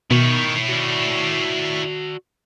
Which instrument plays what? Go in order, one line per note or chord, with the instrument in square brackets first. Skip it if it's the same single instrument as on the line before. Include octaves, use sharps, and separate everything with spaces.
[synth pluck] B2 [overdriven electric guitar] D#3 [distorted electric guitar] E4 C#5
[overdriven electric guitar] F#4 D5